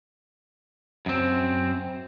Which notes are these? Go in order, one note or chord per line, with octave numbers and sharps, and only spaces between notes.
F#2 C4